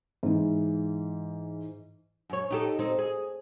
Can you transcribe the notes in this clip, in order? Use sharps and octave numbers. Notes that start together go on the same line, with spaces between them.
G#2 E3
F#2 C#5
D#4 G4 A4
C4 D#4
G#4